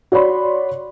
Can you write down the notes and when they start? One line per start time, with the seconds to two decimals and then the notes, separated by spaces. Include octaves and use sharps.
0.12 F#4 C#5 D5 B5 C6